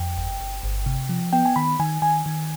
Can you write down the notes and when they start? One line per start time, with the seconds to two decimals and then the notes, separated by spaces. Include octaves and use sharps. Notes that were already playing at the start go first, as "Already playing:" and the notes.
Already playing: F2 G5
0.17 G1
0.40 G1
0.63 G1
0.86 C3
1.09 F3
1.33 B3 G5
1.45 G#5
1.56 D#3 B5
1.80 D#3 G#5
2.02 D#3 G#5
2.26 D#3